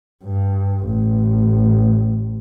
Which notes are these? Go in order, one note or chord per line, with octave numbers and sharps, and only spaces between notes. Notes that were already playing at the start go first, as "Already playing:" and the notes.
G2
A1